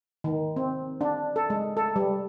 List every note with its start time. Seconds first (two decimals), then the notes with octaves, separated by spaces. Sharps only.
0.24 D#3
0.56 C4
1.01 D4
1.36 A4
1.50 G#3
1.77 A4
1.96 G3